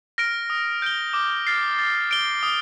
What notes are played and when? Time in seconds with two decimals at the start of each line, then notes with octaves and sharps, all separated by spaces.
0.18 F6 A#6 D7
0.50 D#6
0.82 G6 D7 G7
1.14 D6
1.47 F6 A6 C7
1.79 A6
2.11 D7 G7
2.43 D#6